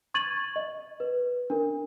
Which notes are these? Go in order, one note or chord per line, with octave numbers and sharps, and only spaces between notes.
C#6 G#6 A6 D#7 F#7
D#5
B4
D4 A#4